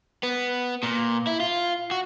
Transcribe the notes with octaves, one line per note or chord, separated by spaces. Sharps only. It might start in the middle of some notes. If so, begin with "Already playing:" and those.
B3
A#2
E4
F4
F#4